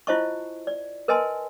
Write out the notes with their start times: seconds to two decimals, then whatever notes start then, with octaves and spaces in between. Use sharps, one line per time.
0.07 E4 F4 C5 D#5 A5 C#6
0.67 D5
1.08 A#4 B4 D#5 G#5 A5 C6